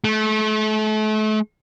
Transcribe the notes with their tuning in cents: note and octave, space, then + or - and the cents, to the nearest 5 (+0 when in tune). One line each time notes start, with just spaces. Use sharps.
A3 -35